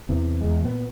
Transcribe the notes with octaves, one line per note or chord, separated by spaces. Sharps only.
E2 C3 E3
E2 G#3
A#2 B3